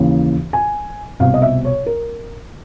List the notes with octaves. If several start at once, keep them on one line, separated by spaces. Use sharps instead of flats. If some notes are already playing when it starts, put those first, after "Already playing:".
Already playing: D#2 C#3 E3
G#5
C2 B2 F5
D#5
E5
C#5
A#4